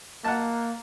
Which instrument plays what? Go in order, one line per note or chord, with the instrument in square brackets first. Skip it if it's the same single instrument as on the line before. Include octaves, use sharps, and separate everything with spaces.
[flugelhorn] A#3 [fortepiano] F#5 A5